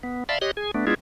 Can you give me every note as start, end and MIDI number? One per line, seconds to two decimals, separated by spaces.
0.03 0.24 59
0.29 0.38 74
0.29 0.38 76
0.29 0.38 77
0.29 0.38 81
0.29 0.38 83
0.29 0.38 84
0.41 0.51 67
0.41 0.51 73
0.41 0.51 75
0.41 0.51 84
0.41 0.51 87
0.41 0.51 90
0.57 0.71 68
0.57 0.71 80
0.74 0.85 57
0.74 0.85 59
0.74 0.85 62
0.87 0.94 56
0.87 0.94 59
0.87 0.94 62
0.87 0.94 64
0.87 0.94 65
0.87 0.94 68